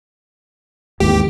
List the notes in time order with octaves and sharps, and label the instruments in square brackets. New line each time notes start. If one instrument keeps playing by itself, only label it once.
[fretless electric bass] G#1 D#2 E3 [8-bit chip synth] G4